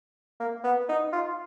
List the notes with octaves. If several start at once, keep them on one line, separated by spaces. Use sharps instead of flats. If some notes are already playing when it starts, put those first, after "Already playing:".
A#3
B3
D#4
F4